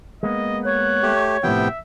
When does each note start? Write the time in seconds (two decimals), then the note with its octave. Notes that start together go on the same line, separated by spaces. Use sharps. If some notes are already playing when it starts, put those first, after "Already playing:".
0.23 G#3 A#3 B3 D#5
0.65 C#5 F#6
1.03 A3 G4
1.43 A2 C3 F3 B3 E5 G5